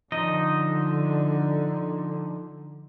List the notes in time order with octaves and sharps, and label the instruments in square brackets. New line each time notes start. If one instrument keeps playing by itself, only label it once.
[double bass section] D3 [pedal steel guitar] F3 D#4 D#5